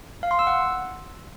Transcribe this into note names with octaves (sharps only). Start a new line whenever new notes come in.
F5
C6
E6
F#5